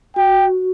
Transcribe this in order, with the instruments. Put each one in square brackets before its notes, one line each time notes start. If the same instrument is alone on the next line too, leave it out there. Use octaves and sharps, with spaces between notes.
[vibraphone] F#4 [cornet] G5